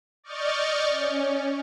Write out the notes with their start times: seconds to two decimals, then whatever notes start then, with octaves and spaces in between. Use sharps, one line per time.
0.24 D5 D#5 C#6 F6 G6 A6
0.91 C#4